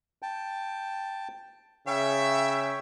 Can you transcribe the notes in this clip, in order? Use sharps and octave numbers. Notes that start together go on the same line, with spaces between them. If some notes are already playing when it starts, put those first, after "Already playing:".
G5 A5
C#3 C#5 E5 G5